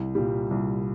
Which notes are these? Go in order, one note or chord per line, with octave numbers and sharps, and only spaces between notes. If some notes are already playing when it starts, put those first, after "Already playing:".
Already playing: C2
A#2 G3
C2